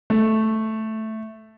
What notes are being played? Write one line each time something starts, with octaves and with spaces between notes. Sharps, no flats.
A3